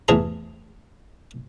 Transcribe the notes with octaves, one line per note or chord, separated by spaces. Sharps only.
A1 E2 G#4 A5 A#5